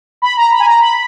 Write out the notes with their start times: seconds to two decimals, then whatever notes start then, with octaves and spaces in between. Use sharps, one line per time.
0.22 B5
0.37 A#5
0.52 B5
0.60 G#5
0.66 A#5
0.81 B5